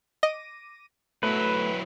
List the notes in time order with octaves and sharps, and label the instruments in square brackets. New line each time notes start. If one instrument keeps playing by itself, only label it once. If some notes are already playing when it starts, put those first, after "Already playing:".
[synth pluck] D#5 [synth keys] D6 A#6 D#7
[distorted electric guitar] F#3 E4 [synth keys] A3 B3 [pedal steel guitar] B4